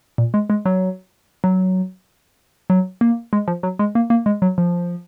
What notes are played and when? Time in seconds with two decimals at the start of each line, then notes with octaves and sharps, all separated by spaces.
0.18 A#2
0.34 G#3
0.50 G#3
0.66 F#3
1.44 F#3
2.70 F#3
3.01 A#3
3.33 G#3
3.48 F3
3.63 F#3
3.79 G#3
3.95 A#3
4.10 A#3
4.26 G#3
4.42 F#3
4.58 F3